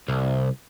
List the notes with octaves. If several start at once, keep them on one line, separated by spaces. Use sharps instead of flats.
C2